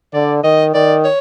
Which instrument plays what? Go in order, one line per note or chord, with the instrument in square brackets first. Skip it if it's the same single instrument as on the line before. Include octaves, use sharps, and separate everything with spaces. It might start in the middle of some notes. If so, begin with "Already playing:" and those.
[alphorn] D3 [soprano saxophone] D5
[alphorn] D#3 [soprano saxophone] D#5
[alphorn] D#3 [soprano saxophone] D5
[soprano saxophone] C#5